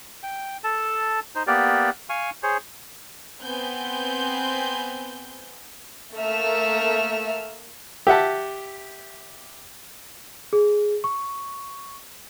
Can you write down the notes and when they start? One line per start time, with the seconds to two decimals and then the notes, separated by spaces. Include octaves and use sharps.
0.23 G5
0.64 A4 A5
1.35 D#4 C5
1.47 A#3 B3 G4 D5
2.09 F5 G#5 C#6
2.43 G#4 C5 C#5
3.40 B3 C4 G#5 G6
6.15 A3 A#3 E5 F6
8.07 G4 E5 F#5 A5
10.53 G#4
11.04 C#6